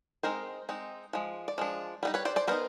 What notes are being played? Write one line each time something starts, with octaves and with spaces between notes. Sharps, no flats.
G#3 C4 D#4 A#4 C5
G#3 C4 D#4
F3 G#3
D5
F3 G#3 D4
G3 B3 D#4
B4 C#5
C5 D5
C5 D5
G3 B3 D#4 A#4 C5